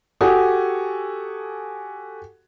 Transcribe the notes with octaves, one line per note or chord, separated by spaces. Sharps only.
F#4 G4 A4 G#5 D#6